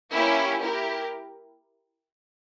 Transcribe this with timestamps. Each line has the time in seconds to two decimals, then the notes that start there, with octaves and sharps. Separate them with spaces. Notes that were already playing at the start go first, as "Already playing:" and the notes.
0.12 A#3 C#4 E4 G4
0.61 E4 G4 A#4